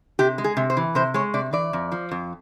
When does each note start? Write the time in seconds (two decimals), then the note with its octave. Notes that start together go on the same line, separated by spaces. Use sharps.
0.19 C3 G4
0.38 G#3
0.44 G#4
0.57 C3
0.70 C5
0.77 E3
0.95 C3 C5
1.14 G#3 C#5
1.34 C3 D5
1.53 E3 D5
1.73 F2
1.92 F3
2.11 F2